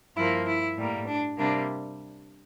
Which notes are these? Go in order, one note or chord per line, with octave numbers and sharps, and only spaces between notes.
G2 F3 A#3 E4
E4
A2 G3 A#3
D4
C3 G3 A#3 D4